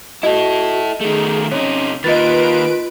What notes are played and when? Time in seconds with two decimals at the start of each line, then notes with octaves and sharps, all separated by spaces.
0.23 E4 F#4 A4 D#5
1.01 D#3 A3 G#4
1.52 C3 C#4 D#4 C#5
2.04 D#3 A#3 F4 B4 D#5 A6 D7